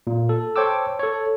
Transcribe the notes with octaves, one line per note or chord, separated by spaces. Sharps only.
A#2
A4
C5 C#5 G5 A5 D6 E6
A4 C#5